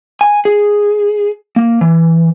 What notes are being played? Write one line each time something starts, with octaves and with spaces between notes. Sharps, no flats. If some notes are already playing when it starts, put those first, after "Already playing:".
G#5
G#4
A#3
E3